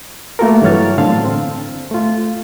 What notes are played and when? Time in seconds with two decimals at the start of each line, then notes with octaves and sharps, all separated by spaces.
0.39 A3 A#3 F4 F#4 A4 A#4
0.62 G2 E3 F#3 C#5 F6 A6
0.98 A2 D3 C4 F5 A5
1.25 C4
1.91 A3 F4